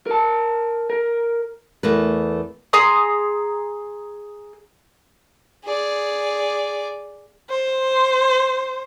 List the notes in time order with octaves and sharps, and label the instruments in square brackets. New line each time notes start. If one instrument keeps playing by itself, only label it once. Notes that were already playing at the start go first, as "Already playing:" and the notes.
[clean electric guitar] A#4 A5
A#4
[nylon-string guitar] E2 A3 A#4 B4
[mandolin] G#4 A#5 C6 D#6
[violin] G#4 D5
[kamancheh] C5